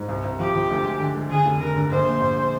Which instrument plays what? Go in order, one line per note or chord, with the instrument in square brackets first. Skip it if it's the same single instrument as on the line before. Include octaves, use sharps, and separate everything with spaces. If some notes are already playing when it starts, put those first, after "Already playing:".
Already playing: [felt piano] G#2
C2
C2
[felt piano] F3 [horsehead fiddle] G4
[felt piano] F3
D2
G#3
D3
G#3
[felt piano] D3 [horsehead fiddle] G#4
[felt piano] F1
[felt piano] D3 [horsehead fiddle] A#4
[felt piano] D3
[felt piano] A#1 [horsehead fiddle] C5
[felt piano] A#2
A#1